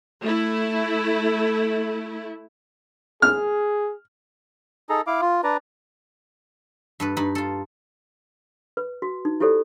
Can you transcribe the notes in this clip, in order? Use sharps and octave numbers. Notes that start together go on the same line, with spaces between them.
A3 E4
G#4 F6
D#4 G#4 A4 A#5
E4 F5 D6
F4
D4 B4 D5 A#5
G2 A4 B4
G2 D#4 B5
F4 A4
B4
F#4
D#4
E4 F4 G4 A4 C5 D5